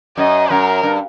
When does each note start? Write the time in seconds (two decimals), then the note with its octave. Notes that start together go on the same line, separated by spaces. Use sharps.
0.17 F#2 D#5
0.50 F#2 A#4
0.83 G2